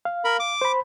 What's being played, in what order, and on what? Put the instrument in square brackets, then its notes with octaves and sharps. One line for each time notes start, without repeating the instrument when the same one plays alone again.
[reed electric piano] F5
[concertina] A#4 B5
D6
[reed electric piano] C5 B5